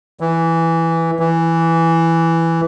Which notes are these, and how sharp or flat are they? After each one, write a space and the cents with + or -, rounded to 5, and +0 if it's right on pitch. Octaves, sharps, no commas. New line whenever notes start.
E3 +0
E3 +5